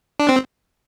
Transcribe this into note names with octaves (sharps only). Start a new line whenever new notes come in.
D4
C4